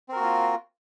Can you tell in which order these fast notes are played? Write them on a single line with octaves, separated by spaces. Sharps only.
C4 A#4 F#4 A#3 F4